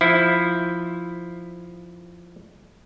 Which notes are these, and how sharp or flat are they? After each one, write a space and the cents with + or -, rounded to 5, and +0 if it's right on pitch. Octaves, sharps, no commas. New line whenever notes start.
F3 +0 E4 +0